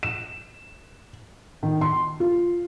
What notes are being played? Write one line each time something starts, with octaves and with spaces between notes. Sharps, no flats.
E7
D#3
C6
F4